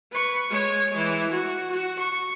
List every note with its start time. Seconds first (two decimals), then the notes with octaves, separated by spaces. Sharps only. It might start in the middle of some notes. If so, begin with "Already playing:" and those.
0.12 B4 C#6
0.50 G#3 C#5
0.93 E3 G#3
1.30 F#4
1.71 F#4
1.99 C#6